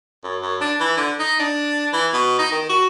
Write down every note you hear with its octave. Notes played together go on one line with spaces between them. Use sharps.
F#2
F#2
D4
E3
D3
D#4
D4
E3
B2
D#4
D#3
F#4